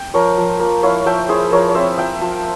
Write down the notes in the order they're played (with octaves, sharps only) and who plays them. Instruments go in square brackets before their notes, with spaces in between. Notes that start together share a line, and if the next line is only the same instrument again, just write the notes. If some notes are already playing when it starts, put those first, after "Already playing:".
Already playing: [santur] G5
F3 A#4 C#5
F3
A#3
E4 C#5 F5
F3 E5 G5
E4 G#4 C5
F3 A#4 C#5
C#5
C4 C5 E5
F3 E5 G5
F3